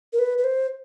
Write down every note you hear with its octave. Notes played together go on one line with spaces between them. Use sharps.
A#4
B4
B4
C5